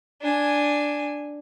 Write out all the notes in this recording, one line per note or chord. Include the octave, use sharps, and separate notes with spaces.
D4 G#5